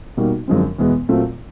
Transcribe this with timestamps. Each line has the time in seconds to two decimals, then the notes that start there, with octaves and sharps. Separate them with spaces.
0.17 B2 G3 A#3 D#4 F#4
0.48 F#2 D3 F3 G#3 C4
0.78 E2 B2 G#3 B3
1.09 A#2 F#3 A3 C4 F4